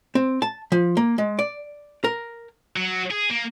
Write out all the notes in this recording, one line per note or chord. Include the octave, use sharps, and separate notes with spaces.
C4
A5
F3
A#3
G#3
D5
A#4
F#3
G#4
A#3